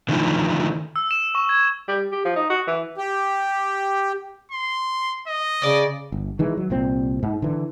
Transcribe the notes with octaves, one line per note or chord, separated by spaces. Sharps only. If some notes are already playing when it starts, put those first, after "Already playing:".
D3 D#3 F3 A3 E4
E6
E7
C#6
G#6
G3
G4
F3
D#4
F#4
E3
G4
C6
D#5
C#3 D5
G1
D#3 E3 G#3
F#3
C2 A#2 C4
G#2
D3 E3